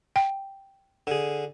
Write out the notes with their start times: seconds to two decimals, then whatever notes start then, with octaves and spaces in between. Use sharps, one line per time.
0.16 G5
1.07 D3 G#4